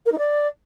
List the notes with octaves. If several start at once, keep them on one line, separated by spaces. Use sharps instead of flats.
A#4
D#4
D5